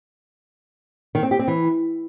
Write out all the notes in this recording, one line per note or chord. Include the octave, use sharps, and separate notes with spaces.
D#3
C4
G4
C4
E3